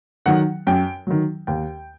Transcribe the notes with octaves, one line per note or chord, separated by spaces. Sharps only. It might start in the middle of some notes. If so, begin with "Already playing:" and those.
D#3 F#3 F#5
F#2 G5
D#3 F#3
D#2 G5